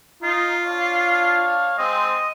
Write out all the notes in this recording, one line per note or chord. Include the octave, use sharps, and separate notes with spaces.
D#4 F4
D4 C#5 F5
G#3 C4 D#5